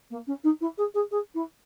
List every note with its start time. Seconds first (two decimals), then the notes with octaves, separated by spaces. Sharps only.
0.10 A#3
0.27 C#4
0.43 D#4
0.60 E4
0.77 G#4
0.94 G#4
1.11 G#4
1.34 E4